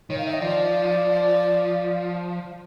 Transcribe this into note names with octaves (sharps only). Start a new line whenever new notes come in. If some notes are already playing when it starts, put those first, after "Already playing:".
D#3 C#5
F5
E5
D#5
F3 D5